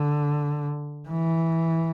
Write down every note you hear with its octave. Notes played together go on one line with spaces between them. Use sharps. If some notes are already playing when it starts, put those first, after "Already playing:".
Already playing: D3
E3